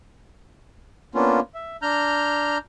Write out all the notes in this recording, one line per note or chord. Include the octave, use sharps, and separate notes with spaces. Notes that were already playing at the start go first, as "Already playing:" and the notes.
A#3 B3 C#4 D4 F4
E5
D4 A#5 F6 G6